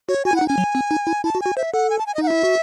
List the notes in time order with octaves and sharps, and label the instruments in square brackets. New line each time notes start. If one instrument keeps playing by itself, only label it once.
[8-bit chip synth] F#4 [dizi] C#5
[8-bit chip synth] F#4 [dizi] G#5
[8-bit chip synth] E4
[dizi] F#5
[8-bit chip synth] D#4
[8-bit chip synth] C#4 [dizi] G#5
[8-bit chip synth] F#3
C4
D#4
E4
[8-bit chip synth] E4 [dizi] A5
[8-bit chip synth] F#4
[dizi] G#5
[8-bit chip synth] F#4
[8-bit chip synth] C5 [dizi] E5
[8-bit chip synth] A4 [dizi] F#5
[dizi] G#5
A5
G#5
D#5
[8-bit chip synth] D#4 [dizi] F#5
[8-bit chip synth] E4 [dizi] E5
[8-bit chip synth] F#4